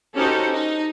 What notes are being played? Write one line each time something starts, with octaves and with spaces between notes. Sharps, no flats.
C#4 D#4 F#4 G4 A4 C5
D#4